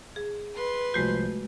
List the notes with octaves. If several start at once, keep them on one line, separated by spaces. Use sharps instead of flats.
G#4
B4 C6
C2 F3 G#3 A3 F#4 G6